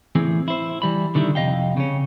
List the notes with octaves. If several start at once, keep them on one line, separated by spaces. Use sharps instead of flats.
A2 E3 C4 G#4
E4 C5
E3 G3 B5
D3 D#3 G3 E4
F2 C3 D#5 F5 G5
C#3 C#4